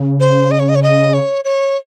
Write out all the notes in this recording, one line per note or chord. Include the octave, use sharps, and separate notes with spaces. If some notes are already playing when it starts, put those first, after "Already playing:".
Already playing: C#3
C5
D#5
C#5
D#5
C#5
D#5
C#5
C#5